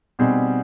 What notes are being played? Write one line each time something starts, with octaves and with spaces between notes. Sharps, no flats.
B2 G3 C4 D#4 G#4